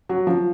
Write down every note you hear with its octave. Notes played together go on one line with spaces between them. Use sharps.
F#3
F3